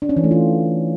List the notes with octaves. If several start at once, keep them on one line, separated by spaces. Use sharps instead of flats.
D4
C#4
E3
A3
F4